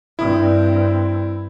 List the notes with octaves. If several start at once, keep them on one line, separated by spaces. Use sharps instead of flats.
G2 C4 E4